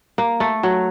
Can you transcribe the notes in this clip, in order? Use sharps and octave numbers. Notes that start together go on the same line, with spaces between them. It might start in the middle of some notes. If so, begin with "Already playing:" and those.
A#3
A3
F#3